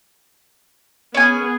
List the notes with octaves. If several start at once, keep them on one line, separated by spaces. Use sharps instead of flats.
B3 C#4 G#4 G#5